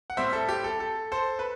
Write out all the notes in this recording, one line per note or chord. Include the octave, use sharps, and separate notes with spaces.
F#5
A2 G3 C4 C5 E5
A4
G4
A4
A4
A4 C5
B4